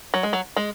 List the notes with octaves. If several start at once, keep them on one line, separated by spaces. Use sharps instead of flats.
F#3
G#3
F#3
G#3